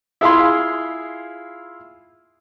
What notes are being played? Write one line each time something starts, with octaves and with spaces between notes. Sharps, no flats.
E4 F4 G#4 F5 B5 C6